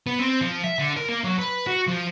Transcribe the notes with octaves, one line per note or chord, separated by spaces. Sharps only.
B3
C4
F3
E5
D3
A#4
A#3
F#3
B4
F#4
F3